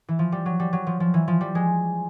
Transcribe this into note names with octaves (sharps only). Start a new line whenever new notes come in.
E3
F3
G3
F#3
G3
F#3
F3
F3
E3
F3
G3
G#3